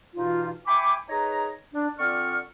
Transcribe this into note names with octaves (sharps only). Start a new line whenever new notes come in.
G2 B2 E3 D#4 F4
E5 G5 G#5 B5 C#6 D6
D#4 G#4 B4 C#5 A#5
D4
D3 C4 F4 D5 C#6 F6